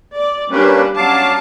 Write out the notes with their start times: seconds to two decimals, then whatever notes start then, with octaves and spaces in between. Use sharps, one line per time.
0.15 D5
0.51 G3 A#3 C#4 D4 B4
0.97 F#3 C#4 F5 A5 D6